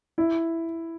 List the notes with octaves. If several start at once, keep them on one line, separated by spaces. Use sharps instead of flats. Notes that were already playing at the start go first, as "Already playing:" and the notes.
E4